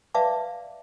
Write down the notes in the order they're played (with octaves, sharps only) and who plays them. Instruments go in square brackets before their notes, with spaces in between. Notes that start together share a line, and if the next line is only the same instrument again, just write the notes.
[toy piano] B4 D5 E5 F5 A5 D6